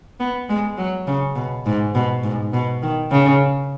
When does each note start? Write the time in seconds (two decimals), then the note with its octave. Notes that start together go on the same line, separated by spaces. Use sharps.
0.20 B3
0.49 G#3
0.78 F#3
1.07 C#3
1.35 B2
1.66 G#2
1.95 B2
2.24 G#2
2.53 B2
2.82 D#3
3.12 C#3